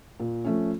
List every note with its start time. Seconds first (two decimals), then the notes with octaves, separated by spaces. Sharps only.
0.20 A#2
0.45 F3 A3 C#4